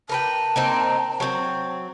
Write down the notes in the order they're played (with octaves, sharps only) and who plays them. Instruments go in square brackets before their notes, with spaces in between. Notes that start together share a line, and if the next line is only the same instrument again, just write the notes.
[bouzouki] A#4 B4 G5 [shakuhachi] A5
[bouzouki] A#3 C4 D#4
F#3 C4